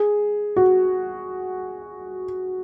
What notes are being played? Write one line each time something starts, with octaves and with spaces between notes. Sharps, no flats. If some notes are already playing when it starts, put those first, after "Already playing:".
Already playing: G#4
F#4